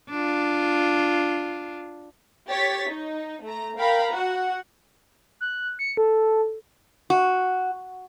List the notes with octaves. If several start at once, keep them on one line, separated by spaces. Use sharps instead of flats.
D4 F4
G4 C#5 A6 B6
D#4
A3 A#5
A#4 F5 G5 A#5 B5
F#4 F#5
F#6
C#7
A4
F#4